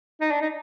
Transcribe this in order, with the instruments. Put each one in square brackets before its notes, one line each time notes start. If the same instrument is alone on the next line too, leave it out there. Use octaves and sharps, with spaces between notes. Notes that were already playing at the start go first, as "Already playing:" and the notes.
[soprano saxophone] D#4
D4
D#4